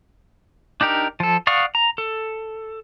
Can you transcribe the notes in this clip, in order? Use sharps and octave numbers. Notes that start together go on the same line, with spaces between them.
D4 D#4 G4 A#4
F3 A4
D5 F5 F#5 C#6 D#6
A#5
A4